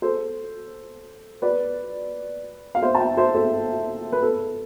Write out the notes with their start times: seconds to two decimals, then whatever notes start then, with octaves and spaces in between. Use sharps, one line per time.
0.02 A4 C5
1.42 B4 D5
2.75 F5
2.82 C5 E5
2.95 A5
3.00 E5 G5
3.17 C5 E5
3.35 A4 C5
4.12 B4
4.23 A4